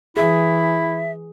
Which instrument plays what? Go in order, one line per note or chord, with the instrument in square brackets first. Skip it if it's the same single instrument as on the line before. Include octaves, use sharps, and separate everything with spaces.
[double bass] E3 [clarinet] E4 [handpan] G#4 [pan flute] E5